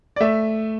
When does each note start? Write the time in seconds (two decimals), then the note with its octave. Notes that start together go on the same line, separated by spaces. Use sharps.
0.16 D5
0.20 A3 E5